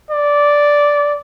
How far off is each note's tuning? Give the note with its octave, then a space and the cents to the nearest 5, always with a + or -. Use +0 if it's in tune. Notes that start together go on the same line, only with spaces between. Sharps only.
D5 -10